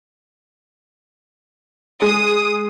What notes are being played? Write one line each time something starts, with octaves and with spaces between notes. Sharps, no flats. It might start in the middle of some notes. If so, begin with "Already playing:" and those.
G#3 D#6